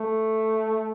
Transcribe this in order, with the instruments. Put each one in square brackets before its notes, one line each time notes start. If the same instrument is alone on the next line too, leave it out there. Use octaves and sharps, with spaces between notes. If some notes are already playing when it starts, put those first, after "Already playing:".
Already playing: [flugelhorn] A3